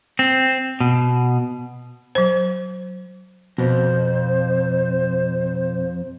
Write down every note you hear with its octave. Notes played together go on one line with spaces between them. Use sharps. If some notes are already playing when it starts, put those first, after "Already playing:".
C4
B2
F#3 C5
F2 B2 C5